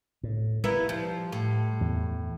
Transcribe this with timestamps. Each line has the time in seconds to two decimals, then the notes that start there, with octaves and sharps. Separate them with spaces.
0.23 A2
0.64 G3 B3 E4 A#4
0.89 F3
1.32 A2
1.81 E2